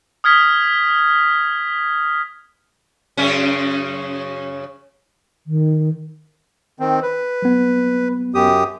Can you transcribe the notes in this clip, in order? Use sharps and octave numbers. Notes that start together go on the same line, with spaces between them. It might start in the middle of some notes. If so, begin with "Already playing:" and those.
D#6 F6 G#6 B6
F#2 C#3 C#4
D#3
D#3 C4
B4
F#3 B3
F#2 G4 D#6